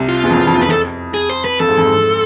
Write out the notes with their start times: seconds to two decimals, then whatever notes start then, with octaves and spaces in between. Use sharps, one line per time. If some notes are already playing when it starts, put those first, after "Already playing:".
Already playing: C2 C3
0.09 F4
0.23 E2
0.30 F2
0.35 E2
0.47 F2
0.58 E2
0.62 B4
0.68 F2 A4
1.14 G#4
1.30 C5
1.45 B4
1.60 F2 A4
1.68 G#2
1.78 F2
1.86 G#2
1.95 F2